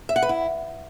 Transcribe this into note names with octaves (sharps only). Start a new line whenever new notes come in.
E5
F#5
B4
E4